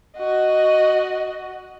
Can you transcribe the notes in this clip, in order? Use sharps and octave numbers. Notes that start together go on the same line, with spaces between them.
F#4 D#5